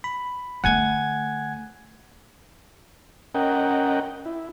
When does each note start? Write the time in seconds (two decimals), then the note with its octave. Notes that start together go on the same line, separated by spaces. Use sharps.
0.04 B5
0.64 D3 A3 F#5 G#5 G#6
3.35 C#4 A#4 D#5 F#5 G5
4.25 E4